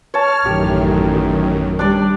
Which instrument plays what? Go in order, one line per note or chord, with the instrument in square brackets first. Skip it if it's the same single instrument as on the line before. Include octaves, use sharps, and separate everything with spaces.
[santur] C#5 A5 [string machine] F6
[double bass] A1 D#3 [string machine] F#2 [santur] G4
[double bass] G3 [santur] D4 D5